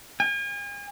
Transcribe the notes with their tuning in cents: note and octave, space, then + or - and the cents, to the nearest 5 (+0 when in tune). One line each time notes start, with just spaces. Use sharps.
G#5 -40